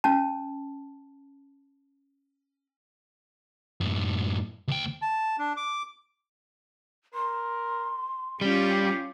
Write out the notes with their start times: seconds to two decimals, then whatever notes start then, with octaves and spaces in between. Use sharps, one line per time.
0.04 C#4 A5
3.81 F#2 A2
4.68 D2 G5
5.02 A5
5.39 D4
5.57 D6
7.14 A#4 C6
8.41 G3 C#4 F4 G4